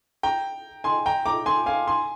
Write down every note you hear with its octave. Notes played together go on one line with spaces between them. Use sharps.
G5 A#5
G#5 C6
G5 A#5
A#5 D6
G#5 C6
F5 G#5
G#5 C6